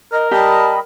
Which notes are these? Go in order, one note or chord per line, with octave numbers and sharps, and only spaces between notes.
A#4 D#5
G3 G4 D#5 A5 B5